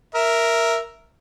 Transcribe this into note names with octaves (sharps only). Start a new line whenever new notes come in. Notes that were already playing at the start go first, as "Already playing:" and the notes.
A#4 E5